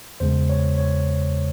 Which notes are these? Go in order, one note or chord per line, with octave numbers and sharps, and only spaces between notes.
E2 C#3 G#3 C5
C#5
C#5